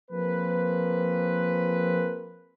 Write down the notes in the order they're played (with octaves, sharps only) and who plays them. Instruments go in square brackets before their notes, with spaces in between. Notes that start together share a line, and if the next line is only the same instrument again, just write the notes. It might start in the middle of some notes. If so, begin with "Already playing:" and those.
[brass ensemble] F3 A#3 C4 G#4 A#4 B4